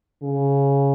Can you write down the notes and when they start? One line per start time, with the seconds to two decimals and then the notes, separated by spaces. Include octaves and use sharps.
0.23 C#3